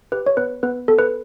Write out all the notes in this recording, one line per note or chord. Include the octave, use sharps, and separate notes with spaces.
G4 B4
C#5
B3 B4
B3 B4
B3 A4
B4